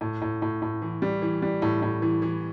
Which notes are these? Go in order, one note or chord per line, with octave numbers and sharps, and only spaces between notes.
A2
A2
A2
A2
E3
G3
E3
G3
A2
A2
E3
E3